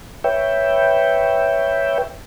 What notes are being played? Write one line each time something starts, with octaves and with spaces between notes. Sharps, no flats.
B4 C#5 E5 G5